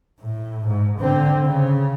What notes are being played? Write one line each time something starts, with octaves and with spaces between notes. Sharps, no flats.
A2
G#2
D3 C4
C#3